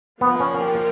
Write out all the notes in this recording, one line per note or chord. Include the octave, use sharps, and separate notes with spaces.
F3 A#3 B3 D4 F4 A#4
C#4
G4